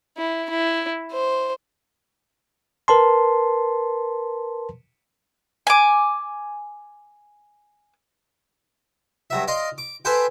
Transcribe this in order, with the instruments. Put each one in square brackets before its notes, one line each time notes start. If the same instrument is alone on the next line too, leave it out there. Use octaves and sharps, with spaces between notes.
[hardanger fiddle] E4
E4
C5
[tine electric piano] A#4 B4 A5 C6
[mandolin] G#5 D6
[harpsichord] G2 F#3 E5
D5 D#5 F5 C6
D6
G#4 A4 B4 C5 F#5 G5